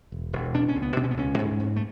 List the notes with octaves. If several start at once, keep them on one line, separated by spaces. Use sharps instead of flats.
E1
E1
B2 D4
C#4
C#2
B3
B2 D4
C#4
B3
C#2 C#4
G#2
G#2
A3